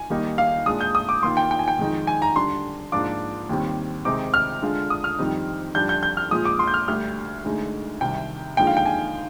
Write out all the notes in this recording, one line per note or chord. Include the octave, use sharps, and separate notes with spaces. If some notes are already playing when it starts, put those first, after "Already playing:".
Already playing: G#5
D#2 D#3 G3 A#3 D#4
F5
A#2 G#3 D4 D#6
G6
D#6
D6
D#2 D#3 A#3 F4 C6
G5
G5
G#5
G5
F2 D#3 G#3 D#4
G#5
A#5
D3 G3 D4 C6
G#2 F3 A#3 D4 F4 D6
D#2 D#3 G3 C4
C3 D#3 G#3 C4 D#4 D6
F6
D3 G#3 D4 F4
D#6
F6
F2 D#3 G3 C4 D#4
F2 D3 G3 D4 G6
G6
G6
F6
A#2 F3 G#3 D#6
D6
C6
G6
F6
D2 D3 G3 F6
D2 D3 G#3 D#4
C2 C3 D#3 G3 G5
D#2 D3 F3 G#3 D#4 G5
F5
G5
G#5